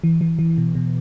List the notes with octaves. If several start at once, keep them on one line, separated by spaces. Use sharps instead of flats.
E3
E3
E3
B2
B2